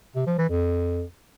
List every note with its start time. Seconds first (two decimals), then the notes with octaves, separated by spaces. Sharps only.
0.15 C3
0.27 F3
0.38 E3
0.50 F2